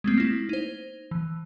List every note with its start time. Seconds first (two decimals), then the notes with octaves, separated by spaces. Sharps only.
0.04 G#3 A3 C4
0.18 A#3 E4
0.49 D#4 C5
1.11 E3